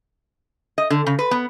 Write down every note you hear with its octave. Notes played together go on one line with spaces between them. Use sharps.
D#5
D3
C#3
B4
B3